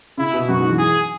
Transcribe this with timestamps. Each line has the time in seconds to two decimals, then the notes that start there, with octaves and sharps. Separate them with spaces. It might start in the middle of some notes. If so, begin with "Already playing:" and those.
0.17 C#3 E4
0.33 B2
0.48 F#2 F#4
0.59 G#2
0.69 E3
0.79 G#4